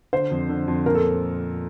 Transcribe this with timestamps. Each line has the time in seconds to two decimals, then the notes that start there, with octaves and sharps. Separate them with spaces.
0.13 D3 C5
0.31 F2
0.49 D3
0.68 F2
0.86 A#2 A#4
0.95 A4